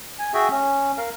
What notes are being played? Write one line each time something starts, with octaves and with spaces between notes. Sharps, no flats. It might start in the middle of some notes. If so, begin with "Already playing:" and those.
G#5
F#4 G#4 E5 G5
C#4
A#4 F5